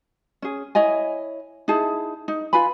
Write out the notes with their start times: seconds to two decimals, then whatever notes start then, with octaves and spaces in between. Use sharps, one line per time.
0.42 C#4 G#4
0.75 E4 C#5 D#5 G#5
1.68 D#4 E4 G#4 A5
2.28 D#4
2.53 F4 B4 G#5 B5